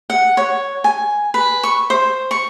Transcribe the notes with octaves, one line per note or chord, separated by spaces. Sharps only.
F#5
C#5
G#5
B4
C#6
C5
C#6